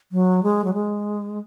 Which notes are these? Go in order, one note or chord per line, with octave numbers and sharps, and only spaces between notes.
F#3
G#3
F#3
G#3